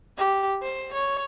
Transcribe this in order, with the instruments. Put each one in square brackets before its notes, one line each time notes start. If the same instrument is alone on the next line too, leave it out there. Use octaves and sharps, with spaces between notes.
[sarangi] G4
C5
C#5